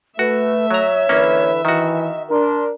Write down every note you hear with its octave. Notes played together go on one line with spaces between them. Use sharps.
A3 F#4 B4 E5
F#3 C#5 A#5
D3 E3 A#3 C#4 B4
D#3 E3 F#4 D#5
D4 A#4 C6